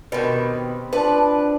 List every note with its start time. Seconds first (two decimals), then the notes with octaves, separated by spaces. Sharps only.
0.12 B2 D#3 C4 G4 B4
0.93 F3 D4 B4 D5